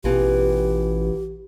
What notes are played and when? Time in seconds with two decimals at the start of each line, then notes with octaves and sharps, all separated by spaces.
0.04 A1 B2 E3 F4 G4